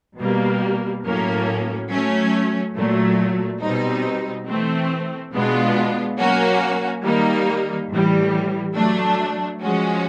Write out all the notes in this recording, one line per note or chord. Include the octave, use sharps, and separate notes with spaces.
B2 G3 A#3
A2 F#3 A#3 C#4
F#3 A3 C#4
A#2 F#3 A3
B2 G3 C4 D#4
E3 A3 C4
B2 G#3 B3 D4 F4
F#3 A#3 C#4 F#4
D#3 G3 A#3 D#4
A2 E3 G3
F#3 A3 D4
F3 G#3 C#4 F#4